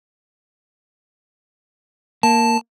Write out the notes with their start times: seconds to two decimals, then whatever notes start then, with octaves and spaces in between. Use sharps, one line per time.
2.23 A#3 A5